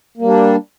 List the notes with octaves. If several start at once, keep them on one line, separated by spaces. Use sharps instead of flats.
G3 A#3 D4